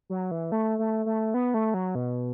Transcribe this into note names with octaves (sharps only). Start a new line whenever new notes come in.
F#3
E3
A3
A3
A3
B3
A3
F#3
B2